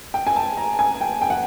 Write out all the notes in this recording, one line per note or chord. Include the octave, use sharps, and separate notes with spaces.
G5
G#5
A5
A#5
G#5
G5
G5
F#5